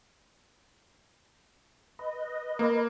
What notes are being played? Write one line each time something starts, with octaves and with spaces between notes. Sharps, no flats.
B4 D#5
A#3